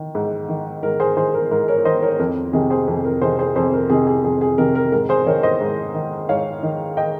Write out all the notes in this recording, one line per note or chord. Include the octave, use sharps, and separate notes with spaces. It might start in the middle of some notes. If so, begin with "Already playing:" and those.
Already playing: D#3
G#2
D#3
G#2 A#4
G#4 C5
D#3 G#4 C5
A#4
G#2 A#4
A#4 C#5
D#3 C5 D#5
A#4 C#5
F2 A#4
C3 D#3 G#4
G#4 C5
F2
A#4
C3 D#3 G#4 C5
G#4 C5
F2 G#4 C5
A#4
C3 D#3 G#4
G#4
F2 G#4
G#4
C3 D#3 A#4
A#4
G#2 A#4
G#4 C5
D#3 A#4 C#5
C5 D#5
G#2
D#3
G#2 C#5 F5
D#3
D#5 G5